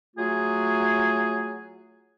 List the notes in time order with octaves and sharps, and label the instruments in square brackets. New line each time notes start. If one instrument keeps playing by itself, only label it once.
[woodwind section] F#3 A3 F4 G#4